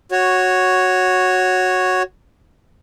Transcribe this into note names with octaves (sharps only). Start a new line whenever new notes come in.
F#4 C#5